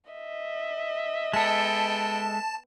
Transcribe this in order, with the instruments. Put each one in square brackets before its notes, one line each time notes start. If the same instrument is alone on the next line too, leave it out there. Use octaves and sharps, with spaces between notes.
[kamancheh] D#5 E5
[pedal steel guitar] G#3 A4 [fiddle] B3 G5 [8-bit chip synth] A5